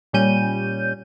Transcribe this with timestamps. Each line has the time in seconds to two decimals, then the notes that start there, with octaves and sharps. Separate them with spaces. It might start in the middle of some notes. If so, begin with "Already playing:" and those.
0.13 A#2 G3 C#4 G6 D#7